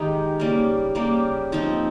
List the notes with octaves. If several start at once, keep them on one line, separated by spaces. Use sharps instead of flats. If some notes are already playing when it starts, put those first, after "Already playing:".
Already playing: D#3 G#3 D#4 G4
C#3 G3 A#3
C#3 G3 A#3 G4
F3 C4 D#4